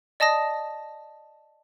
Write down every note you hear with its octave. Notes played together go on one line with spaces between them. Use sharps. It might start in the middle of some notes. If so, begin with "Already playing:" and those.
D5 D#5 A5 D#6 A#6